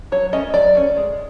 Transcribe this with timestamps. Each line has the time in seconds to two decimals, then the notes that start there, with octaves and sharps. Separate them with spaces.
0.12 F#3 C#5
0.33 A3 C#4 D#5
0.54 F#3 D5
0.75 A3 C#4
0.97 G#3